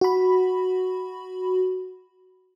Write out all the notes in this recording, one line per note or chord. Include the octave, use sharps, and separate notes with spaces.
F#4 B5